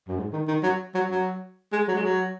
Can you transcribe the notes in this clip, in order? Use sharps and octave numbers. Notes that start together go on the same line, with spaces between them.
F#2
G#2
D#3
D#3
F#3
F#3
F#3
G#3
F#3
G#3
F#3